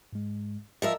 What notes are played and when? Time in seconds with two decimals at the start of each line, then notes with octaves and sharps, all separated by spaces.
0.13 G#2 G#3
0.82 F3 A#4 D#5 E5 E6